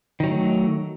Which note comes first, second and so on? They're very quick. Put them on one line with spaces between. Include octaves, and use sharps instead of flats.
D#3 F#3 A3